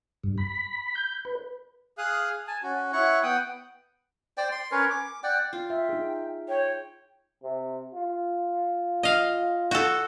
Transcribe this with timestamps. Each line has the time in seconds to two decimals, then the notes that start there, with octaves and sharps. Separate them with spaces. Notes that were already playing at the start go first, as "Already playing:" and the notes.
0.24 G2
0.38 B5
0.95 G6
1.25 B4
1.98 G#4 F5 D#6 F#6
2.47 G#5 A5
2.63 C#4 F#4
2.93 E4 C#5 F#5 C#6
3.23 B3 F#5 G5 D#6
4.37 C5 D5 G5
4.52 C6
4.72 C#4 A#4 B4 C#5
4.90 D6
5.24 D5 F#5 G5
5.53 F4 G5
5.70 E5
5.89 D#4 G#4
6.48 C#5 G5
7.43 C3
7.94 F4
9.03 D#5 F5
9.71 F#4 A4